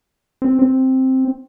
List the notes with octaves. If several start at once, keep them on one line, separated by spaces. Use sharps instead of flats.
C4
C4